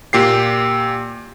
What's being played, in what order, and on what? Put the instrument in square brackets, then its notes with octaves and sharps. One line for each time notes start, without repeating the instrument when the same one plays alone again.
[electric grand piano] A#2 G4 C7